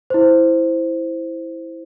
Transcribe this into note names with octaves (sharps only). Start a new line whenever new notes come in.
E4 C5